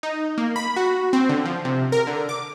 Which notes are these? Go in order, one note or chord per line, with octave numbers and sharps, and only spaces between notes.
D#4
A#3
B5
F#4
C4
D3
F3
C3
A#4
D3
D6